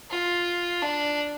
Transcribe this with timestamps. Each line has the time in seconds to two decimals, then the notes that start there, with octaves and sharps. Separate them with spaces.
0.10 F4
0.82 D4